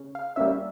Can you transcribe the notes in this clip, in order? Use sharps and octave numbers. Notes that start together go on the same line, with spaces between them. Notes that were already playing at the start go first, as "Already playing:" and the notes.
Already playing: C#3
F5
G3 A#3 C#4 E5